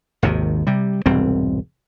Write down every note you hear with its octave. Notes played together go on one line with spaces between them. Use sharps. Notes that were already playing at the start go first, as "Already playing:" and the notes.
G#1 D#2 C3 D#3
C3 G3
E1 C2 G#2 C4